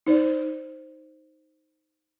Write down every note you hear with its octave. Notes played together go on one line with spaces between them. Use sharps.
D#4 C5 D5